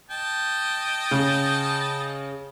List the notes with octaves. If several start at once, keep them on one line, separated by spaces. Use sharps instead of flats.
D#5 G5 A5
C#3